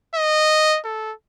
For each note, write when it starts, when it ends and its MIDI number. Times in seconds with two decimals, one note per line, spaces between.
0.15 0.79 75
0.85 1.13 69